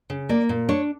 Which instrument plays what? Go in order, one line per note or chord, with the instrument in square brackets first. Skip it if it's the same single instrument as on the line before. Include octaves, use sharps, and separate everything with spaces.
[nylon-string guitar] C#3
A#3 D5
A#2
D4 C#5